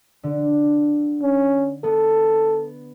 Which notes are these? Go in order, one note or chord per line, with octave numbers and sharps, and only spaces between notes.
D3
C#4
B3 A4